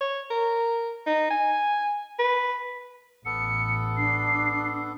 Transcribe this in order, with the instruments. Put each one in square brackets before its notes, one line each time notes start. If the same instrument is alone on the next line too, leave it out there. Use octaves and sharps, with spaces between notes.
[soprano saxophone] C#5
A#4
D#4
G#5
B4
[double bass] A1 [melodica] B3 A4 [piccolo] C#7
[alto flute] D4 [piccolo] C7